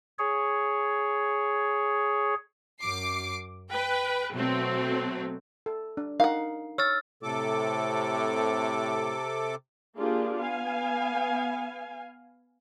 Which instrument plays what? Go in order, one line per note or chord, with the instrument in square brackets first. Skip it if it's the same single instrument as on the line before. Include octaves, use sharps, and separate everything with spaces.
[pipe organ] G#4 C#5
[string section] F#2 D6 C7
B4 G5
B2 F#3 A3 C4
[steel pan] A4
D4
[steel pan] D#4 A#4 [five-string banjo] F5 F#5
[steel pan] C#5 [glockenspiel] E6 F6 A6
[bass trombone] A2 [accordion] C3 A4 D6
[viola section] A#3 D4 F4 G4 G#4
B3 F5 G#5